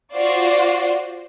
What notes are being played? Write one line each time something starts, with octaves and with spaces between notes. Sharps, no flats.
F4 F#4 C5 D5